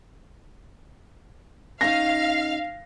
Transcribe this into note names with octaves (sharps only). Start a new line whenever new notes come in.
C#4 D#4 F5 A#6